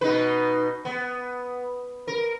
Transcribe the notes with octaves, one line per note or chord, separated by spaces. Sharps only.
B2 D#4 B4
B3
A#4